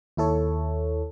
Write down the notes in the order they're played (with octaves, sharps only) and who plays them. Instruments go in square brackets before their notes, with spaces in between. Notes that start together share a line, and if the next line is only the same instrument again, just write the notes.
[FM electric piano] D#2 E4 A4 C#5